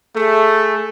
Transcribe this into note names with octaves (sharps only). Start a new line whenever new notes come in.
A3 G#4